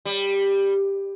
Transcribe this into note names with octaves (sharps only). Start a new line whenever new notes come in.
G3